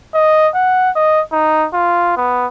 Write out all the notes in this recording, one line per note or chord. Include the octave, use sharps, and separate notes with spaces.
D#5
F#5
D#5
D#4
F4
B3